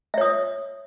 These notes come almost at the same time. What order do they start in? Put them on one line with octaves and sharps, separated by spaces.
E5 C#5 D#6